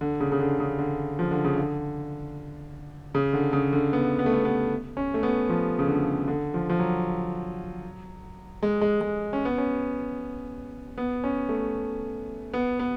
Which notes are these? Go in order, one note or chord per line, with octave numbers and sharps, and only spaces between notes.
D3
C#3
C#3
D3
C#3
D3
F3
D3
C#3
D3
C#3
D3
C#3
D3
B3
B3
A3
B3
B3
C#4
A3
B3
F3
C#3
D3
D3
F3
F3
F#3
G#3
G#3
G#3
C#4
B3
C#4
B3
C#4
A3
B3
B3